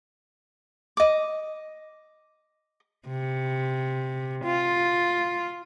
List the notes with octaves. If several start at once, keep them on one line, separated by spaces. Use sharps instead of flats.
D#5 D6
C3
F4